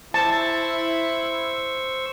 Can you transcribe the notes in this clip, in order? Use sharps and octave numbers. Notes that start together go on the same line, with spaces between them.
E4 C5 A5 C#6 E6